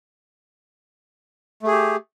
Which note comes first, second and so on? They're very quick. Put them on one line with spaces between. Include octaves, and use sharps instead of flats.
A3 G#4 G4